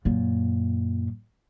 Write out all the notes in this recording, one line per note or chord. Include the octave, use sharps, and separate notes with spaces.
F#2 A#2